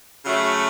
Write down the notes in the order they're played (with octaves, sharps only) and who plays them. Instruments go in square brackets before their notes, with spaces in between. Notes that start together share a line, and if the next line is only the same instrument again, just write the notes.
[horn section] C#3 F#3 A3